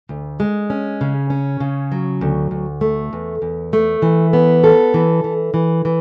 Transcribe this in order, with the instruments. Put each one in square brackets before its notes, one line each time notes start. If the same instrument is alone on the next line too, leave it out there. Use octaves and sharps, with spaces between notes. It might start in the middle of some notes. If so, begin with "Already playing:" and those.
[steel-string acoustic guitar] D2
G#3
C#4
C#3
C#4
C#3
F#3
D2
D2
A3
E2
E2
A3
E3
B3
A4
E3
E3
E3
E3